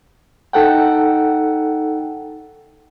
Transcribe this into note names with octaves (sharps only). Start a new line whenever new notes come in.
D#4 A4 F#5 G5